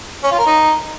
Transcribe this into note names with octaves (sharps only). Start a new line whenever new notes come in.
C#4
F4
A#4
D#4